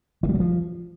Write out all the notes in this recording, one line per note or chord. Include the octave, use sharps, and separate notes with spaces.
E3
G3
F#3
F3